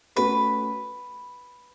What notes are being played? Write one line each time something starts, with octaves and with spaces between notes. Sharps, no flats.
A3 C#4 F#4 A4 B4